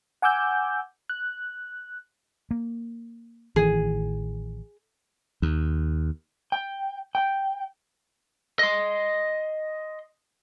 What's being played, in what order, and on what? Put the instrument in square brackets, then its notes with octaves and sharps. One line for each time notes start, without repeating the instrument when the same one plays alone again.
[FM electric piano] F#5 G#5 D6 E6 G6
F#6
[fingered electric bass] A#3
[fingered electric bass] A1 D#3 E3 [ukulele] G#4
[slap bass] D#2
[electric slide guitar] G5
G5
[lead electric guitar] D#5 C6